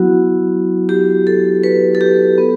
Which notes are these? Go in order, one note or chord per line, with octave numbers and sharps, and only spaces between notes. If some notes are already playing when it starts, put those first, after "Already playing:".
Already playing: F#3 B3 E4 F#4
G4
A4
B4
A4
G4
B3